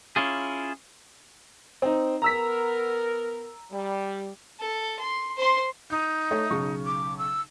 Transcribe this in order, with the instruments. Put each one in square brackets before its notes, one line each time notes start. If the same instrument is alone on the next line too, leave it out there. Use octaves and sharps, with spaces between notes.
[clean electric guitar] C#4 E4 F4 G#4
[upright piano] C4 D#4
[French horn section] B3 A#4 [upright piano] A#5 E6 B6
[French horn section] G3
[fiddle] A4
C6
C5 C6
[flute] D#4 [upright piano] G6
[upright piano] A3 C#5 E5
B1 C#3 C#6
[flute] D6
E6